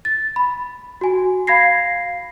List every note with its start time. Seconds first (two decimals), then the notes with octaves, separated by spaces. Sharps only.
0.05 A6
0.36 B5
1.01 F#4 G#5
1.47 F5 B5 G#6 A#6 C7